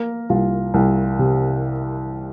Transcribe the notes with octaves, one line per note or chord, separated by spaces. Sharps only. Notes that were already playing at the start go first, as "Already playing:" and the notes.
Already playing: A#3 A#4
C2 F4
C2
C3